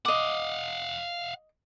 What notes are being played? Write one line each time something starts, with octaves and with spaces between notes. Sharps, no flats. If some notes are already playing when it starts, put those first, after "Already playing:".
D#5 F5 F#5 D6